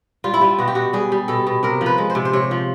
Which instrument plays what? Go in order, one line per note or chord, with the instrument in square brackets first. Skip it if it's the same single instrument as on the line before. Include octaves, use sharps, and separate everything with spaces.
[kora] G3 F4
E4
G3 F4
B2 F#4
G4
B2 F#4
G3 G#4
G3
B2 A4
B2
C3 A#4
F3
B4
G#3
C5
C3
C5
C3 C#5
F3